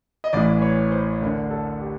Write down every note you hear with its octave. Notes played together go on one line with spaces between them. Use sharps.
D#5
A1 A2 E3 D5
C#5
C5
D2 D3 A#4
A4
G4